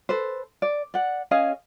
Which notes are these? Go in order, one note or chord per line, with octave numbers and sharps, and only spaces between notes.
A4 B4 C5
D5
D5 F#5
C#4 G#4 D#5 F5